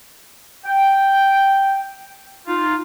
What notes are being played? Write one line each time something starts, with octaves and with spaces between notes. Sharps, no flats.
G5
D#4 F4